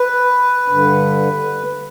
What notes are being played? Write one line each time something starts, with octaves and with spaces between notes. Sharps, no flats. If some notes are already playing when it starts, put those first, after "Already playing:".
Already playing: B4
G2 D3